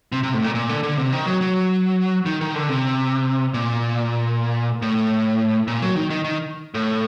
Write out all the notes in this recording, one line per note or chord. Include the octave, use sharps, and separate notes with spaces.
C3
C3
A2
A#2
A#2
D3
D3
C3
D#3
F#3
F#3
D#3
D#3
D3
C3
A#2
A2
A#2
F#3
D#3
D#3
D#3
A2